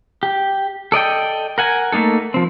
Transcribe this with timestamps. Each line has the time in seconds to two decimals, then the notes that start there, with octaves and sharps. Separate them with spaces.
0.23 G4
0.92 A4 D5 D#5 G5
1.58 A#4 F#5 G#5
1.92 A3 A#3 D#4 A4
2.34 F3 C4